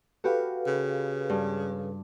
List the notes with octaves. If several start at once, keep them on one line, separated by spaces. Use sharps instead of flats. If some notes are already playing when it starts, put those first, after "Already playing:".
F#4 G4 A4 B4 F5
C#3
G2